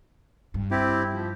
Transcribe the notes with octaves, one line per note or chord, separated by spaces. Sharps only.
G2
C4 E4 G4
F3